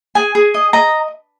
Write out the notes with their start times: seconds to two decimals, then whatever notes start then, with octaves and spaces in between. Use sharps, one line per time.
0.15 G#4 G#5
0.35 G#4
0.54 D#5
0.73 D#5 A#5